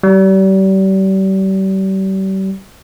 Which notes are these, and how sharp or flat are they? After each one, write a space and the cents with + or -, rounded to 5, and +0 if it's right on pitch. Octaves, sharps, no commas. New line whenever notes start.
G3 -35